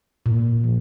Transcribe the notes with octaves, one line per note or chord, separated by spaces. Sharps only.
A#2
F3